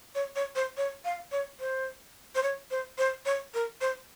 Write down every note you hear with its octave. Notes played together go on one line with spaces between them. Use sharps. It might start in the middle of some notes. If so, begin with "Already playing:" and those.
C#5
C#5
C5
C#5
F5
C#5
C5
C5
C#5
C5
C5
C#5
A#4
C5